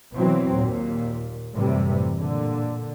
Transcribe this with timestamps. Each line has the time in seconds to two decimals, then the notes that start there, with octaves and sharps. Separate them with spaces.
0.14 B2 E3 F#3 C4
0.55 D#2 A#2
1.54 F#2 A2 C3 E3 G3
2.19 A#2 D3